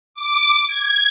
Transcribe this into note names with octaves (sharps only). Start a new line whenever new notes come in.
D6
G#6